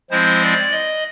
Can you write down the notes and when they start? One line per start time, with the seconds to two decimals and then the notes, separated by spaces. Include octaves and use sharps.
0.10 F3 G#3 C4 E4 C5
0.42 D5
0.72 D#5